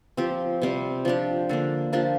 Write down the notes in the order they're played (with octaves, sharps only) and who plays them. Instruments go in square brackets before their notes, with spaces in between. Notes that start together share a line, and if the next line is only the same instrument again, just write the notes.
[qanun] F3 C4 G4
C3 G3 C4 G4
F3 D4 G4
D3 A#3 D4
F3 A#3 D4 G4